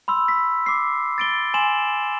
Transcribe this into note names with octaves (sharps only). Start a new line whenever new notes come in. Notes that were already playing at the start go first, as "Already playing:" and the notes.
B5 C6 E6
B6
D6 C7
A6 D7 G7
G#5 C6 E7 F#7